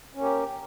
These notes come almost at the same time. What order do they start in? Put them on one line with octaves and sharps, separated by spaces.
C#4 A#3 G4